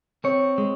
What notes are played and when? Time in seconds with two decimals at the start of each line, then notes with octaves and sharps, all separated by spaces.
0.24 C4 C#5
0.58 G#3